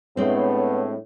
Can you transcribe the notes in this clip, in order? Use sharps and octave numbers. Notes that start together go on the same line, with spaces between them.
A2 G#3 B3 C4 D4 C#5